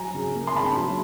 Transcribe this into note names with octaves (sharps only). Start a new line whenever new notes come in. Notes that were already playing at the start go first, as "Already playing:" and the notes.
Already playing: F#3 G#5 A#5
C#3
A#3
C6
C#3 A5 B5
F#3